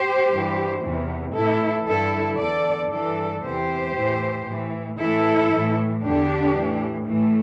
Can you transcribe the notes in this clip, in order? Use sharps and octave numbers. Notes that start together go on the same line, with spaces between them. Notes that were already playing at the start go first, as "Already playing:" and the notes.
Already playing: G4 C5
G2 E3
E2 C3 E3
A2 E3 E4 A4
G2 D3 E4 A4
E2 D3 A4 D5
G2 E3 A4 D5
E2 C3 E3 G4 C5
A2 E3
A2 E3
A2 E3 E4 A4
A2 E3
E2 D3 D4 G4
A2 E3
A2 E3 A3